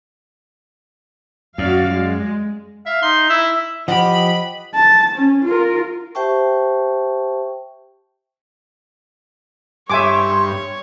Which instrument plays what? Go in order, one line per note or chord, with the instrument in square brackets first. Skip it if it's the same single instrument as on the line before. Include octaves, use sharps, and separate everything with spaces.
[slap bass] F#2 [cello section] F#4 D5 F5
[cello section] G#3
[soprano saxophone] E5 [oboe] F5
[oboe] D#4 [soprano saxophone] C6
[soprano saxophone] E4 [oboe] E5
[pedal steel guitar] F3 G4 [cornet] D#5 [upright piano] F#5 [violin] B5
[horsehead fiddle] A5
C#4
F4 A#4
[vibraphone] G4 C5 E5 G5 A5 C#6
[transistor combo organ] G2 [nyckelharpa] C#5 [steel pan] E5 G#5 D6 [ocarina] C6